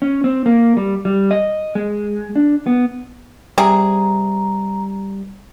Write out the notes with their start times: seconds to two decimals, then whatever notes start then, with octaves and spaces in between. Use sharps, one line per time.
0.02 C#4
0.24 C4
0.46 A#3
0.77 G3
1.05 G3
1.31 D#5
1.75 G#3
2.36 D4
2.66 B3
3.58 C3 G3 G#4 A#5